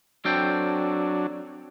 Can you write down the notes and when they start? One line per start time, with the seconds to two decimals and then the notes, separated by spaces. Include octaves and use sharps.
0.25 F#3 C4 D4 A4 G5